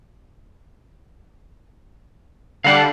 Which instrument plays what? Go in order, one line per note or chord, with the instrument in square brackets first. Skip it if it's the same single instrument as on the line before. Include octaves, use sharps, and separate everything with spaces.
[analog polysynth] D3 G3 D4 [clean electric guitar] F5 F#5